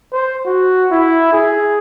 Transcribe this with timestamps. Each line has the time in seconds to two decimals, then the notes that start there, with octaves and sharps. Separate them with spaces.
0.12 C5
0.45 F#4
0.91 E4
1.33 G#4